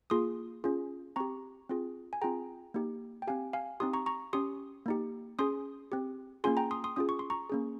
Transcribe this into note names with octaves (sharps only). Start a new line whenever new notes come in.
A#3 F4 G#4 C6 D#6
C#4 F4 G#4
C4 G4 A#5 C#6
C4 F4 G#4
G#5
C4 F4 G#4 G5 A#5
A#3 D#4 G4
G5
C4 G4 F5 G#5
F5 G#5
C4 D#4 G4 C6 D#6
A#5 C#6
A#5 C#6
C#4 G4 C6 D#6
A#3 D#4 G4
C#4 G#4 C6 D#6
C4 G4
A#3 C#4 F4 G#4 G#5 C6
G5 A#5
C6 D#6
C6 D#6
C#4 F4 G#4 D#6
C#6
C6
A#5 C#6
A#3 C#4 G#4